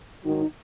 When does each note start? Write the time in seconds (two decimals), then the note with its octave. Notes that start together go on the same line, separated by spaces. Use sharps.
0.24 G#2 D#3 F#3 D#4
0.41 D#4